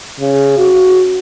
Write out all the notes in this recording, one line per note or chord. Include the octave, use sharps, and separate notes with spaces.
C#3
F#4